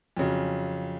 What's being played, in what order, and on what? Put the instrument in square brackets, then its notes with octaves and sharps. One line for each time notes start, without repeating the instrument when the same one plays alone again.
[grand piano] F2 C#3 F#3